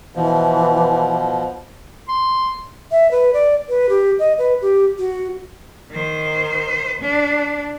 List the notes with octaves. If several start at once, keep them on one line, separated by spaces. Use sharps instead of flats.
B2 E3 F3
C6
E5
B4
D5
B4
G4
D#5
B4
G4
F#4
D#3 C5
D4